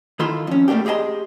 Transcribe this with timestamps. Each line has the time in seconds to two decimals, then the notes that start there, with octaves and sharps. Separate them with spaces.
0.20 D#3 E4 F4 A4 C6
0.47 F2 C#4
0.68 B2 A3 A#3 D4 G4
0.86 G4 G#4 D#5 A5 C6